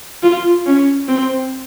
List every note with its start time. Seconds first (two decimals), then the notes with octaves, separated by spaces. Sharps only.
0.23 F4
0.66 C#4
1.08 C4